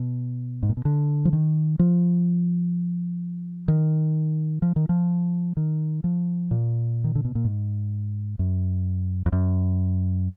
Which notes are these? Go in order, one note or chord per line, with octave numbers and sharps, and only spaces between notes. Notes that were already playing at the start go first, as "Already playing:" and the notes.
Already playing: B2
G#2
A#2
B2
D3
F3
D#3
F3
D#3
F3
D#3
F3
D#3
F3
A#2
D#3
D3
B2
A#2
G#2
F#2
F2
F#2